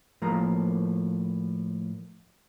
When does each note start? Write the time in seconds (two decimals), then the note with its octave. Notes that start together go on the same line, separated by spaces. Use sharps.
0.22 A2 F3 A#3 A#5